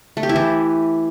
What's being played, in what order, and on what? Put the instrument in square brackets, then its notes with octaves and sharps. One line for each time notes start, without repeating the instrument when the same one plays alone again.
[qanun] A3
G4
E4
E3